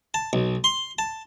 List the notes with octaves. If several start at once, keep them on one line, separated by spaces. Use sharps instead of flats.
A5
B1
C6
A5